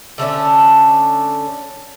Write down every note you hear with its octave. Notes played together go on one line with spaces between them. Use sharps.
D3 A3 C#4 D4